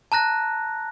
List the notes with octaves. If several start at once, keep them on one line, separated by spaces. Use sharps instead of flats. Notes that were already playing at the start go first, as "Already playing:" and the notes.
A5 A#5 F#6 A#6